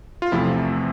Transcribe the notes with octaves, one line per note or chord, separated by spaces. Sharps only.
F4
E2 C3 F3 A3 E4